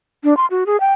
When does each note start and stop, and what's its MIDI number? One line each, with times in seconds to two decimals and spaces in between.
0.24 0.37 62
0.37 0.46 84
0.51 0.64 66
0.66 0.79 68
0.80 0.93 79